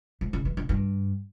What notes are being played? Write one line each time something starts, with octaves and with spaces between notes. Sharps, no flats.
G#2
C#3
E3
D3
G2